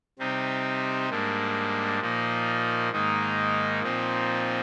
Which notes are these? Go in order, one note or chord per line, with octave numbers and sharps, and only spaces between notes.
C3 G3 C4 D#4
G#2 G3 A#3 D4
A#2 F3 A#3 D#4
G#2 D#3 A#3 D#4
A#2 F3 C4 D#4